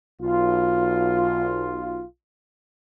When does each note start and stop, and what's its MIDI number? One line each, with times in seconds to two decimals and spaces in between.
0.22 2.04 35
0.22 2.04 65